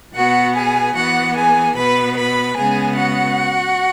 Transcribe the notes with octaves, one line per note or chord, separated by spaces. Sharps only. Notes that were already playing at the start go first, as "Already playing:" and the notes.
B2 B3 F#4 F#5
G#4 G#5
E3 B3 F#4 F#5
G#4 G#5
B2 B3 B4 B5
B4 B5
C#3 G#3 B3 G#4 G#5
F#4 F#5